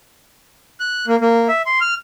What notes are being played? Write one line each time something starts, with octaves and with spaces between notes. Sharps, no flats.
F#6
A#3
A#3
E5
C6
F6